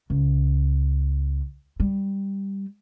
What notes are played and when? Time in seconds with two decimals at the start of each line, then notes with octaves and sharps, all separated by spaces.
0.10 C#2
1.80 G3